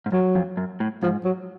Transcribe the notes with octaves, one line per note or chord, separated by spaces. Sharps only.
G#2
F#2 F#3
F2
F#2
A2
G#2 F3
F#3